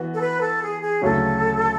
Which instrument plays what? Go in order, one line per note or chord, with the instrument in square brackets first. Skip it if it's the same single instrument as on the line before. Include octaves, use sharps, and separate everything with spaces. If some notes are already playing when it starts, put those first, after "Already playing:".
Already playing: [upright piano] E3 B3 F#4
[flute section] A4
B4
A4
G#4
G#4
[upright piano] D2 C#3 F#3 A3 C#4 [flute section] A4